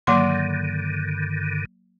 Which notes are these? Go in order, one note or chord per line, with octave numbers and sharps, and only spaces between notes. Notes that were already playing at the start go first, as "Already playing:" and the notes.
G2 D3 D#3 F#3 A#3 C6